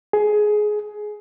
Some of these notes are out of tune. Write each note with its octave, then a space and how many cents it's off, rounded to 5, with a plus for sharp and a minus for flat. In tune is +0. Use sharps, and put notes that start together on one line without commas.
G#4 +15